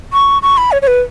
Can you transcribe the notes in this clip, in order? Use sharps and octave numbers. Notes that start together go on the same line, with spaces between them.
C#6
C#6
B5
C#5
C#5
B4